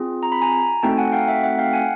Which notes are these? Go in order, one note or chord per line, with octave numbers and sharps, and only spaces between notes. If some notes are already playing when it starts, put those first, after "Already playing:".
Already playing: C4 F4 G#4
A#5
B5
G#5 A#5
A3 C4 D#4 F#4 A4 G5 A5
F#5 G#5
F5 G5
E5 F#5
E5 F#5
F5 G5
F#5 G#5